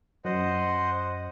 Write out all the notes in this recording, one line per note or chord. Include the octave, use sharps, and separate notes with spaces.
F#2 C5 D#5 F#5